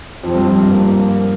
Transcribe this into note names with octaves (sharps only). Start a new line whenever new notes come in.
F2 C4
G2
F2
G2
A#3